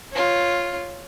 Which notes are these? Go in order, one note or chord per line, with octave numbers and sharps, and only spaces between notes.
F4 C#5